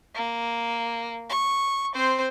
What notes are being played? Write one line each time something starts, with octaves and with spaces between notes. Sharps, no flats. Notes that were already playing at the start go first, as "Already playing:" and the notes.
A#3
C#6
C4 C5